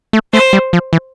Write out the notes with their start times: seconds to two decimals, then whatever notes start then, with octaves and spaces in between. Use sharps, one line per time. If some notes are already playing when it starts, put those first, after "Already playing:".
0.13 A3
0.33 A3 C5
0.53 G3
0.73 F3
0.93 E3